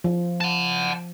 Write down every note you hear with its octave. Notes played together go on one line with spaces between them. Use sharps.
F3
F#5 A5